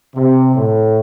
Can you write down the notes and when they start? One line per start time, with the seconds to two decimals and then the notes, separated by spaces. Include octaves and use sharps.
0.15 C3
0.56 A2